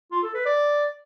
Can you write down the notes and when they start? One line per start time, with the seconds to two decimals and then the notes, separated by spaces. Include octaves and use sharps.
0.11 F4
0.23 A4
0.34 B4
0.46 D5